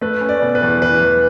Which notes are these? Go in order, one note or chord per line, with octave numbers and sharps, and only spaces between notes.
A3 B4
C#4
D5
B2
B4
E2
E3 B4
E2